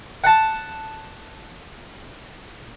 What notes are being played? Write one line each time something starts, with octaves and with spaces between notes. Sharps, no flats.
F#5 A5